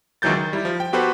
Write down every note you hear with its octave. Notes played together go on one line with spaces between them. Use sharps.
C#2 D#3 E3 F#3 G6 A6
D#3
G3 E4
F3
G5
B3 F#4 G4 A4 B4 C5